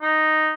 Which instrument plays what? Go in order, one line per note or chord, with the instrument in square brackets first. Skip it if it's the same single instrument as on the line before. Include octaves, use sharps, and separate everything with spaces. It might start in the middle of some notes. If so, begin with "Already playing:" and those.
[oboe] D#4